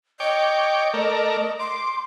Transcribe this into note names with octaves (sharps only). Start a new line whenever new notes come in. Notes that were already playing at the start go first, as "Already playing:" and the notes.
C#5 D#5 G5 D6
A3 A#4 D5
C6 D6